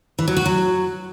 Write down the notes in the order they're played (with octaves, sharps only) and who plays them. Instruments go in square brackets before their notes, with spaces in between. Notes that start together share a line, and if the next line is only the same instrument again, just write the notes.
[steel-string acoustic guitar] E3
F#3
F#4
F#3